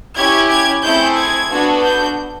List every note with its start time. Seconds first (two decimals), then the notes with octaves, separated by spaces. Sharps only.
0.16 C#4 E4 G4 G#6
0.50 G#6
0.83 A3 C4 E4 G#4 G6
1.17 G#6
1.50 B3 D4 F#4 A4
1.83 G6